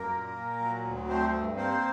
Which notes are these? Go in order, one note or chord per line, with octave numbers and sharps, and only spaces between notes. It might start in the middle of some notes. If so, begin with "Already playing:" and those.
Already playing: F#2 A#3 A#4
A#2
A#2
F#3
D2
A3 C4 C5
G2
A#3 C4 C5